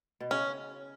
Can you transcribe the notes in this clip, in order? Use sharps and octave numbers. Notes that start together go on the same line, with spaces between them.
B2
C#3 C#4